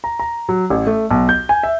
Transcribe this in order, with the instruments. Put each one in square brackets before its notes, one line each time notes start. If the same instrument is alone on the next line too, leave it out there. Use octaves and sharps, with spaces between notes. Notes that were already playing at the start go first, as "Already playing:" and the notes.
[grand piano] A#5
A#5
F#3
A1
A3
B1
G6
G#5
E5